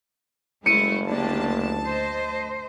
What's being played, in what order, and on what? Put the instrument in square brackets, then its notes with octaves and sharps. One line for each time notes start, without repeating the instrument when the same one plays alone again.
[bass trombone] F#1 [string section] G#3 A3 E4 [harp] C#7 D#7
[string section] D2 A5 [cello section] A#3 D4 G4
[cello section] C5 D#5